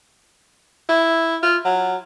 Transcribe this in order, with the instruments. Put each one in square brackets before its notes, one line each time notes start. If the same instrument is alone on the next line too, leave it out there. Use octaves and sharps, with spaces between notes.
[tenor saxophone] E4
F4
F#3